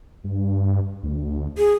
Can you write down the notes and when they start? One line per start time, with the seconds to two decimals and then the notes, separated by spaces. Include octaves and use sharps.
0.24 G2
1.03 D2
1.57 G#4